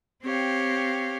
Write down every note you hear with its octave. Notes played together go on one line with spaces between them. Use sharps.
C4 G4 C#5 F5